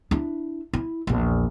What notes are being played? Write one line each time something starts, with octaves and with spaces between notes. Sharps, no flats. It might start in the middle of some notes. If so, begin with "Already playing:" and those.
D4 E4
E4
A#1 E2